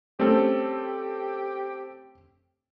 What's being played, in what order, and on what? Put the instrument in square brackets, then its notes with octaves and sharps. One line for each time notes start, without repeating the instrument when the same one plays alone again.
[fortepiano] G3 A3 C#4 [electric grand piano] C4 A4 [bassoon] G4